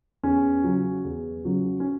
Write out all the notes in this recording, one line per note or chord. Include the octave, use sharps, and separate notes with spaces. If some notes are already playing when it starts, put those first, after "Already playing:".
E2 C#4
C#3 F#3
E2
C#3 F#3
C#4